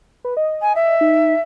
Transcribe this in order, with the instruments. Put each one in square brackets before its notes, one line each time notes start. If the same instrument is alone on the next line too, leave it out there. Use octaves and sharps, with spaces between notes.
[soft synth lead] B4
D#5
[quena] G#5
E5
[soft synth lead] D#4